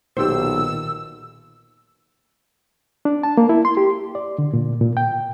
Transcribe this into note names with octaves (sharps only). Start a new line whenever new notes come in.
B1 A#2 D#3 G4 C5 E6
D4
A5
A#3
E4
C6
G4
D5
D3
A#2
A#2
G5